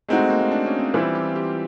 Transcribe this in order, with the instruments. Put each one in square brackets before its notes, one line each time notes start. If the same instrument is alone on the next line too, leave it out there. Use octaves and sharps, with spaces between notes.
[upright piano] G#3 C4 D#4 F#4 [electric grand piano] A3
[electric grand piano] A3
A#3
A#3
D4
C#4
C4
[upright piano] E3 G3 C4 E4 [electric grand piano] F4
[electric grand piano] G4
G4